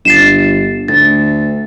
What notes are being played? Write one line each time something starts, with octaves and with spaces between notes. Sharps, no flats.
G1 A6 C7 E7
D2 A6